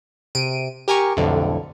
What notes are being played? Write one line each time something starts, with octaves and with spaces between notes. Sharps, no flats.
C3 D7 D#7
G4 A#4 G#5 A#5 C#6
B1 F2 A2 D3